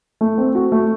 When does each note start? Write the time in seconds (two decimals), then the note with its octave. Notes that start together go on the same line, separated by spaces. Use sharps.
0.21 A3
0.38 C4
0.55 F#4
0.72 A3